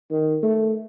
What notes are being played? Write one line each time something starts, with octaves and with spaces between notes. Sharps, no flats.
D#3
A3